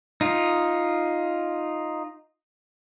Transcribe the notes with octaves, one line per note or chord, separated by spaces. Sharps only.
D#4 F4